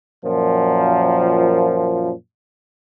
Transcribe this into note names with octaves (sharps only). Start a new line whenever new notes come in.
F#2 A#2 F3